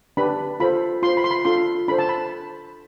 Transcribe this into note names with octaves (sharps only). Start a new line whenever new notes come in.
D4 G4 B4 B5
F4 A4 C5 B5
F4 C5 C6
B5
C6
B5
D4 F4 A4 C6
D4 A4 C5 B5
A5
B5